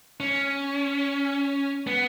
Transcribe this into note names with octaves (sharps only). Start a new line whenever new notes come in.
C#4
B3